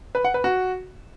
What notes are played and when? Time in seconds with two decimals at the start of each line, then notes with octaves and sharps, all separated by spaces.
0.15 B4
0.24 F#5
0.34 B4
0.44 F#4